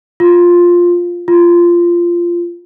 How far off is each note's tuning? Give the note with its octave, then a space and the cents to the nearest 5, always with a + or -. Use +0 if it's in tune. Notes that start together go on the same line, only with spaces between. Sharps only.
F4 +5
F4 -15